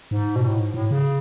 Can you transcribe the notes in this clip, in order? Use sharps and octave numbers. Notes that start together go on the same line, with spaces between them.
G#2
B2
A2
G#2
A2
C#3